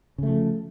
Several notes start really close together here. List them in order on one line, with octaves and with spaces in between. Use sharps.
C#3 A3 F3